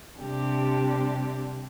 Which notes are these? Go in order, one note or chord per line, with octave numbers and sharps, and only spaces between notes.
C3 G3 D4 G4